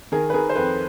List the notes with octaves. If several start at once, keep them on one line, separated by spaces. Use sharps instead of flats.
D#3 G#4 A#4
B4
D#3 G#4 A#4
C5
F2 A4 B4